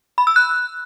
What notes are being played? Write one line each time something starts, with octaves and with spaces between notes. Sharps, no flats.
B5
E6
F#6